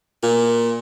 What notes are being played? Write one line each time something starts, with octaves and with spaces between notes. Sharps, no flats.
A#2